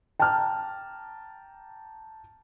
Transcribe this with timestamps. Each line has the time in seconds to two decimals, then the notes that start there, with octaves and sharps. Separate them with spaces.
0.20 G5 A5 A#5 D6 F6